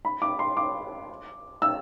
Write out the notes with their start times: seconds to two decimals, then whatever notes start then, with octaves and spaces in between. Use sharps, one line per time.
0.05 B5
0.22 D6
0.39 C6
0.57 D6
1.62 E6